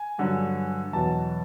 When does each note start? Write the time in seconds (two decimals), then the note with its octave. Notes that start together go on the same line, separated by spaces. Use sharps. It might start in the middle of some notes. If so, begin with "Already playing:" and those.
Already playing: G#5
0.18 G2 D3 F#3
0.93 E2 B2 F#3 A5